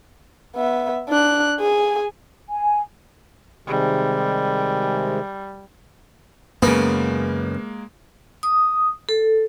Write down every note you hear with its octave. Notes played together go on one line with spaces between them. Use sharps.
B3 E5
D4 F#6
G#4 G#5
G#5
C3 D#3 G3 G#3
F#2 C#3 G#3 A#3 B3
D#6
A4